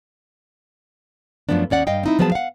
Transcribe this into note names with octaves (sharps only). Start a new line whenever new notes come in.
F#2 D3 F3 A3 B3 D4
D#2 C#4 D5 F#5
G2 D#5 F5 G5
C4 D#4 E4
F3 F#3 B3 G#4 D#5 A5
F5 F#5